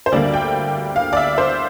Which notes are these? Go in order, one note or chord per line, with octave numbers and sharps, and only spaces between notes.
C5
D2 D3 G3 A#3 D5
G5
F5
D5
E5
C5